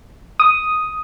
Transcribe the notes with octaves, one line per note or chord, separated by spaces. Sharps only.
D#6